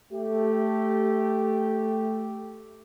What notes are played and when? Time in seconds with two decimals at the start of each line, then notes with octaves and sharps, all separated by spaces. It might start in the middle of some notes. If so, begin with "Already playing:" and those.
0.13 A3 G4